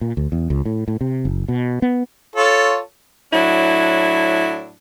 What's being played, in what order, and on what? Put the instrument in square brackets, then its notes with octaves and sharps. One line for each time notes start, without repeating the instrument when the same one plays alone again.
[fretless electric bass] A#2
D2
E2
C#2
A2
A2
C3
F#1
B2
B3
[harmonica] F4 A4 C#5
[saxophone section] A2 F#3 D4 E4